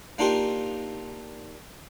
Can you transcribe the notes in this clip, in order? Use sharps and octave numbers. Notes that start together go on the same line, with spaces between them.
A#3 D4 D#4 F4 G4 A#4